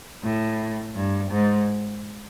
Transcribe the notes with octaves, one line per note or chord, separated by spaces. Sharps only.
A2
G2
G#2